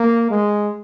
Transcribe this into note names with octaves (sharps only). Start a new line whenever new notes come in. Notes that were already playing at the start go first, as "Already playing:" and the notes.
Already playing: A#3
G#3